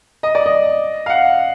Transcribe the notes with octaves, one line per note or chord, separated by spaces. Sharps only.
D#5
D5
D#5
F5
F#5